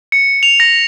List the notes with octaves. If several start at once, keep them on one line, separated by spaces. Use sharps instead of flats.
C#7
F7
A#6